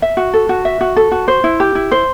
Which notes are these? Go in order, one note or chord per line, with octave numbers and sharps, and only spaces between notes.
E5
F#4
A4
F#4
E5
F#4
A4
F#4
C5
E4
G4
E4
C5